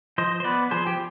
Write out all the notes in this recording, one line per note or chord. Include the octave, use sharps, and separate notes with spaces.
F3 C5 D#5
C5
B3 B4 D5
F3 G#4 C5
G4